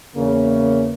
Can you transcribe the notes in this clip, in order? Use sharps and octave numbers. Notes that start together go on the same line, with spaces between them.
E2 C#3 A#3